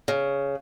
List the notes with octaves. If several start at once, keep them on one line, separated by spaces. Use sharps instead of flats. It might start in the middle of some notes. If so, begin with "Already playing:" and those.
C#3